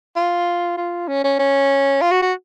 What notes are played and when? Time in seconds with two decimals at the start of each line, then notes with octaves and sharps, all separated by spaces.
0.16 F4
0.77 F4
1.08 C#4
1.24 C#4
1.39 C#4
2.02 F4
2.11 F#4
2.22 F#4